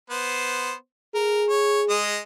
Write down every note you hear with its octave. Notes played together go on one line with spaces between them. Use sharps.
B3 C5
G#4 A#4
C#5
G#3 D#5